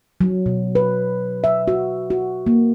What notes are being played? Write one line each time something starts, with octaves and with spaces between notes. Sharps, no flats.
F#3
B2
B4
E5
F#4
F#4
A#3